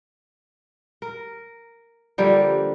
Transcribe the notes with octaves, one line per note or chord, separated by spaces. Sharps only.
A#4
D3 F3 G3 A#3